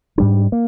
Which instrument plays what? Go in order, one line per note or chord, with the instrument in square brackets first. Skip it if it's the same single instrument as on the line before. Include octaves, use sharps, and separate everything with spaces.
[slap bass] G#2 G3 D4
A#3